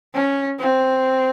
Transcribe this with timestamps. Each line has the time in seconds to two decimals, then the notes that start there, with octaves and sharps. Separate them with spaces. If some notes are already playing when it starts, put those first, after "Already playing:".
0.14 C#4
0.59 C4